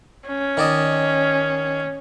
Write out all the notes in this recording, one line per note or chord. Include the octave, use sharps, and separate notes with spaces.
C#4
D#3 D5 D#5